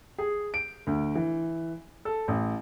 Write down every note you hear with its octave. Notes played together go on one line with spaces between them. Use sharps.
G#4
D7
D2
E3
A4
A1